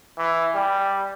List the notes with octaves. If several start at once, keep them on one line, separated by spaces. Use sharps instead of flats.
E3
G3